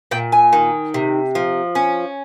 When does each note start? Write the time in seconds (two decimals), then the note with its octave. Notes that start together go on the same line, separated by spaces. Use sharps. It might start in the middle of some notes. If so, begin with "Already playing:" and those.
0.11 A#2 G5
0.32 G#5
0.53 D#3
0.94 C3
1.35 F3
1.75 C#4